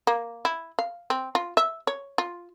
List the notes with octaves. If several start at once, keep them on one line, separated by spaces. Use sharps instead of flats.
A#3
E4
F5
C4
F4
E5
C#5
F4